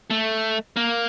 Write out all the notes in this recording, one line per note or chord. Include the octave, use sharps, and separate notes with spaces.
A3
A#3